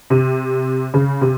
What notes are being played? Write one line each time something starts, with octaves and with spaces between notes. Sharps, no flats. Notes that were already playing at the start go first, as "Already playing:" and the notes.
C3
C#3
C3